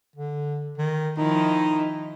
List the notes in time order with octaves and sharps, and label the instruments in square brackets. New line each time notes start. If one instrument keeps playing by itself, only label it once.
[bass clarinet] D3
D#3
[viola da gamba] D#3 F3 E4 [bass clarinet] D#4